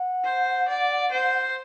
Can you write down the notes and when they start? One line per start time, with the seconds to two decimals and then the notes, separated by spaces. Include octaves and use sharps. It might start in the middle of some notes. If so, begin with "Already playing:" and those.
Already playing: F#5
0.24 C5
0.68 D5
1.11 C5